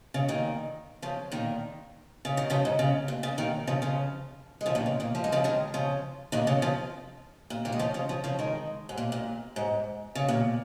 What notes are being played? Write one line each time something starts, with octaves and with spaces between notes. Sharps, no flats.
C#3
A#2 D#3
C#3 F3
A#2 D#3
C#3
D#3
C#3 F3
G#2
C#3
A#2
C#3
A#2 D#3
C#3 F3
C#3 F3
G#3
C#3 F3
A#2 D#3
C#3
A#2 D#3
F3
G#3
C#3 F3
D#3 G#3
C#3 F3
A#2 D#3
C#3
C#3 F3
A#2
A#2 D#3
G#3
C#3 F3
C#3 F3
C#3 F3
C#3 F3
D#3 G#3
G#2
A#2
A#2
G#2
C#3
A#2